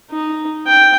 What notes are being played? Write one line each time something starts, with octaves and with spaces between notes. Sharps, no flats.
D#4
G5